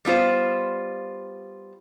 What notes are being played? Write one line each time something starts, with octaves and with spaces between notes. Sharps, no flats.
G3 B3 F4 C5